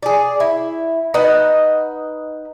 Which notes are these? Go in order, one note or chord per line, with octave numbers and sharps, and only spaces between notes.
G#4 D5
E4
D#4 B4 D#5 F#5